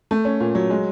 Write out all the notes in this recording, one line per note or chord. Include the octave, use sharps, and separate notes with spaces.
A3
C#4
A#2
F#3
G#3